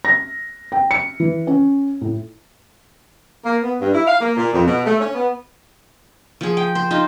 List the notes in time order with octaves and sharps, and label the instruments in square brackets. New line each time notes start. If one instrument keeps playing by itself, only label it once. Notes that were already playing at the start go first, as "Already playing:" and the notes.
[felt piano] A#6
G5
C#7
E3
C#4
A2
[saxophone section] A#3
B3
G2
E4
F5
A#3
A#2
F2
B2
A3
C#4
B3
[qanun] F3 G#4
G5
C5
D#4 F4